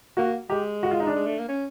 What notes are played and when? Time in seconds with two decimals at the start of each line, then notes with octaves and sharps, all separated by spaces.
0.17 A#3 F#4
0.50 G#3 G4
0.83 F#4
0.91 F4
1.00 D#4
1.07 D4
1.16 G#3
1.26 A3
1.38 A#3
1.49 C#4